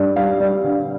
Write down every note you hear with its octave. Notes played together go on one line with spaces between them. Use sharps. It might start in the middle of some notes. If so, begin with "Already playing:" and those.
Already playing: G2 G3
G3 F5
G3
D3